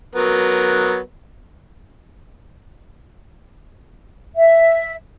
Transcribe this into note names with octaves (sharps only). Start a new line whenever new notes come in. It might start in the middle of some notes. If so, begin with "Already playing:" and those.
F#3 B3 A#4
E5